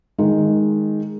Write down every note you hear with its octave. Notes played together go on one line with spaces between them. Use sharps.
D#3 G#3